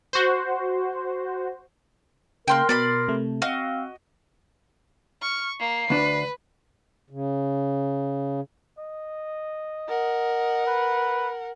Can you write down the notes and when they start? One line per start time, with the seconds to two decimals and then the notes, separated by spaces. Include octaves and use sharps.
0.13 F#4 C5
2.48 C#3 A#3 A#4 G5 C6 F#6
2.69 B2 D5 B5 C6
3.08 C3 A3
3.42 C4 F#4 D#5 F5
5.22 C#6 F6
5.60 A#3 C7
5.90 D2 D4 B4
7.10 C#3
8.78 D#5
9.88 A#4 F#5
10.67 B4